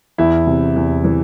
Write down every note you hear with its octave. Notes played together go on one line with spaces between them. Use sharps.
E2 E4
C3
E2
E3